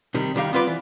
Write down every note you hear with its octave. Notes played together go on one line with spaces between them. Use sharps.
C3 D#3 G3
C2 D#3 G3 D#4 F5
B3 C4 F4 B4 D5
E3